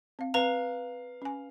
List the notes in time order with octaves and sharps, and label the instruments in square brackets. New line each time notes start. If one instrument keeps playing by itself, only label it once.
[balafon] C4 F5
[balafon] C4 [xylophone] B4 A#5 [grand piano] F5
[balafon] C#4 G#5